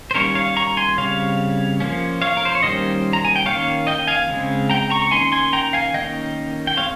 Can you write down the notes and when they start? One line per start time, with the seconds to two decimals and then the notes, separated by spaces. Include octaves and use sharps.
0.11 C5
0.14 D#3 G3 A#3 C#4 A#4 C#5
0.35 C#5 F5
0.57 A#5 C#6
0.77 G#5 C6
0.97 C#3 G3 C4 C#5 F5
1.80 F3 A#3 C#4
2.22 C#5 F5
2.37 A#4
2.45 C5
2.55 C#5
2.63 D#3 G3 A#3 C#4 C5 D#5
3.13 A#5
3.25 G#5
3.36 G5
3.46 D#3 A#3 C#4 C#5 F5
3.87 D#5 G5
4.07 F5 G#5
4.29 C#3 G#3 C4
4.70 G5 A#5
4.90 A#5 C#6
5.02 C#6
5.11 D#3 A#3 C#4 G#5 C6
5.32 G#5 C6
5.53 G5 A#5
5.73 F5 G#5
5.94 D#3 A#3 C#4 D#5 G5
6.67 G5
6.77 G#3 C4 C#5 F5